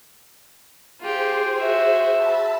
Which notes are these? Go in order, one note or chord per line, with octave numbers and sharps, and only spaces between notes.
F4 G4 G#4 C5
F#4 E5
A5 B5 E6